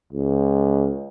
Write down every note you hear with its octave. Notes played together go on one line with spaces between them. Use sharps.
C#2